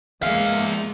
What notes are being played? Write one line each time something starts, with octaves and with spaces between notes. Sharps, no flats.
G#3 A#3 G#4 E5 F5